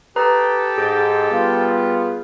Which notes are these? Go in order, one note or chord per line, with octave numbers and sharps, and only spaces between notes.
G4 A4 B4 A#5 D#6
G#2 G#4 G6 A6
G3 B3 F4